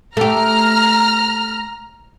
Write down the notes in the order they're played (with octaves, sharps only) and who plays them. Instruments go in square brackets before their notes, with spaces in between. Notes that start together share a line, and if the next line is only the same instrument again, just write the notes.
[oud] A3 G4 [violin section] A#5 F6